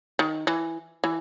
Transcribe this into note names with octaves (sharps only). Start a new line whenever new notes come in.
D#3
E3
E3